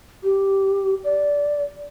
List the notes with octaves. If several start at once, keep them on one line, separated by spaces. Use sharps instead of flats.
G4
D5